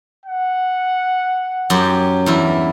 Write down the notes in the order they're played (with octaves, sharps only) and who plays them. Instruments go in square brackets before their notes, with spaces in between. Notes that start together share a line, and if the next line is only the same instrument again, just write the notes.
[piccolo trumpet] F#5
[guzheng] F#2 G4
E2 G2 E4